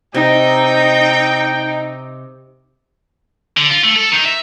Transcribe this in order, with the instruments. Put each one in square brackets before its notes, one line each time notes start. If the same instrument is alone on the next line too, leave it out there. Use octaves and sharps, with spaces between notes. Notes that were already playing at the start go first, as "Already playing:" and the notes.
[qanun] C3 [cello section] D#4 [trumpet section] G5
[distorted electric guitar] D3
F4
A3
A4
D#3 D#4
E5